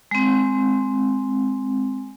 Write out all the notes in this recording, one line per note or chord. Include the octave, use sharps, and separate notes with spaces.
G#3 C4